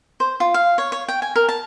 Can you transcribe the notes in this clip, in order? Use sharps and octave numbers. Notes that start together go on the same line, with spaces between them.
C5
F4
F5
C#5
C#5
G5
G#5
A#4
A5